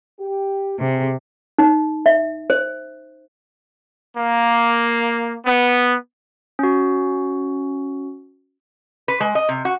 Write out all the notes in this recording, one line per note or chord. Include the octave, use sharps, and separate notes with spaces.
G4
C3 C4 G#4
D#4
E5
C5
A#3
B3
C#4 F#4
B4
G#3
D#5
C3
F#4